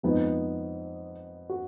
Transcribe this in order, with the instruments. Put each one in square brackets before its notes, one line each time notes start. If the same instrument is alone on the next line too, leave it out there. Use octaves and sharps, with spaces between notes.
[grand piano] F2 F3 G#3 B3 D#4
F#4